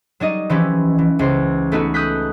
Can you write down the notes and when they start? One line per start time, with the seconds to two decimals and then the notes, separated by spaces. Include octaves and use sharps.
0.20 F#3 G3 D#4 D#5
0.50 E3 F3 C#4 E4 G4
0.98 E3
1.19 C#2 C5
1.72 A3 B3 D#4 F#4
1.94 D#6 F#6 G6 B6